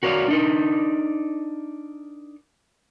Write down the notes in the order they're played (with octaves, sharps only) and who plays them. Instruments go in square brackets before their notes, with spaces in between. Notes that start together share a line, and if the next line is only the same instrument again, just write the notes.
[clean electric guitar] F#4 A#4 C#5 D5 F5
D4 D#4 A#4